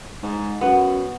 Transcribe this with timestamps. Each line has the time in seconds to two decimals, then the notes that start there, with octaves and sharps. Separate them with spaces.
0.23 G#2
0.61 F#2 B3